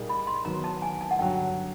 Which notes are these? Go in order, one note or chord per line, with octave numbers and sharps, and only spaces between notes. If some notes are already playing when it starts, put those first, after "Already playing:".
Already playing: A#2 G3 A#3 D#4 G#4
B5
C6
D#3 F#3 B3 A#5
A5
G#5
A5
F#5
G2 D3 F#3 G5